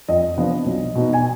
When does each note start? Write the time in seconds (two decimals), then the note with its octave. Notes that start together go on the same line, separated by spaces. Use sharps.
0.08 F2 D#5
0.37 C3 F3 B3 D4
0.66 B1
0.95 B2 B3 D#4
1.13 G#5